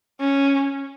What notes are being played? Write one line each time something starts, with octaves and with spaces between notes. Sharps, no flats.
C#4